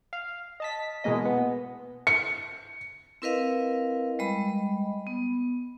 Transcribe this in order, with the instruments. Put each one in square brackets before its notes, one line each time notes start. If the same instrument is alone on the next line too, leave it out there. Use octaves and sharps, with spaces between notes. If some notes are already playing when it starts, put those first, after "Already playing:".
[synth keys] F5
D#5 A5 B6
B2 E3 G#3 A#3 D#5
B3
[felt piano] C#7
[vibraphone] C4 E4 A#4 B4 D#5 F5
G3 G#3 D#5 B5
B3